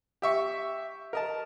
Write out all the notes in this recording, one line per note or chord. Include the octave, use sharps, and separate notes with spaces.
G4 E5 C#6
A#4 D#5 A5